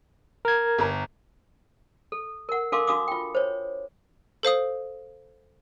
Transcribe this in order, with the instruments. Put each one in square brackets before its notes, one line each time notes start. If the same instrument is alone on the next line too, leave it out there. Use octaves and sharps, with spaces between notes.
[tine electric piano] A#4 G#6
[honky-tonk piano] G1 A#5
[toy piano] A4
A#4 F#5
D4 A4 A#4 F5 C6 D6
D4 F#4 F5 D6 D#6
F4 G5
C5 C#5
[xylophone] A4 C5 F5 D#6